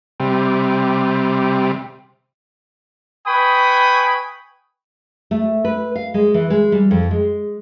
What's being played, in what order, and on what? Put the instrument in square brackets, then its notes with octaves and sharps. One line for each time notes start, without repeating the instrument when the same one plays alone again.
[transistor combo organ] C3 G3
[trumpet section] B4 G5 G#5 B5 C#6 D#6
[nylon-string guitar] A3
B4
F5
G#3
E3
G#3
G3
F2
G#3